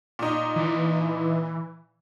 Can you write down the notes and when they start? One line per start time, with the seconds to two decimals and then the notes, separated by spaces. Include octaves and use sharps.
0.19 A#2 D#4
0.56 E3